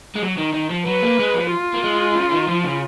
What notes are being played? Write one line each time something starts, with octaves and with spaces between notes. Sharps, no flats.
G#3
F#3
D#3
D#3
F3
F#3 B4
A#3
G#3
F3
F4
A#3
G#3
C#3
D#3
F3
C#3